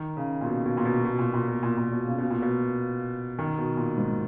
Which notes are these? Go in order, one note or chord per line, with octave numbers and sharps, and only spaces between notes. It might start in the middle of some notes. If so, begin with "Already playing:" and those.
Already playing: D#3
C#3
A#2
B2
B2
A#2
B2
B2
A#2
A#2
B2
A#2
A#2
B2
C#3
B2
A#2
B2
D#3
B2
A#2
G#2